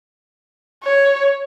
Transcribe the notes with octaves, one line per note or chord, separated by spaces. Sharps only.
C#5